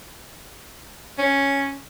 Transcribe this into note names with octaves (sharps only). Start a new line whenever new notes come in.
C#4